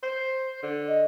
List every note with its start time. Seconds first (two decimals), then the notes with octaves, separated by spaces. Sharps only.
0.03 C5
0.62 D3
0.89 D#5